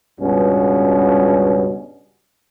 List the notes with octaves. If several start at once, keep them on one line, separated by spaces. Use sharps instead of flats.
C#2 G2 B2 C#4